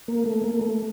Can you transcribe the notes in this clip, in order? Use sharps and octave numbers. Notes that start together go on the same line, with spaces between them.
A#3
A3
A#3
A3